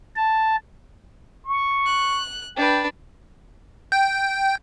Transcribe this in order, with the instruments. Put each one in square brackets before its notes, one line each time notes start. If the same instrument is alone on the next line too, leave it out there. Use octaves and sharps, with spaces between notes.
[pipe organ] A5
[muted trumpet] C#6
[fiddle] F#6
[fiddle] D4 B4 [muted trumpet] G5
[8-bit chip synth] G5